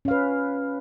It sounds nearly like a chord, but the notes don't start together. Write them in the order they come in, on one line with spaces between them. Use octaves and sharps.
C#4 F5 B4